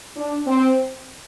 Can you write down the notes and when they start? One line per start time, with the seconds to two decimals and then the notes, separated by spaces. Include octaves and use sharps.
0.16 D4
0.47 C4